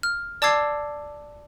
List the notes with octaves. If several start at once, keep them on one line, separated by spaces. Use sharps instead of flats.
F6
D5 A5 D6 E6 G#6 C7